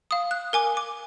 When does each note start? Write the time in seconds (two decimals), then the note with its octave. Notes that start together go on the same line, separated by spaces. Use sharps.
0.11 F5 D#6
0.31 F#6
0.53 A#4 G#5 D6
0.77 D6